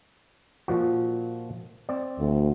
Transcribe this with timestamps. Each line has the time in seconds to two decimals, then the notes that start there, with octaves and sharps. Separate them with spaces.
0.68 A#2 F3 F#4
1.89 C4 D5
2.19 D2